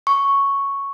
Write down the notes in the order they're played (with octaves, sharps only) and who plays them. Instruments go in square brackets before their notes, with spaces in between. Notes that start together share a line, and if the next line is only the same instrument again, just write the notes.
[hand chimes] C#6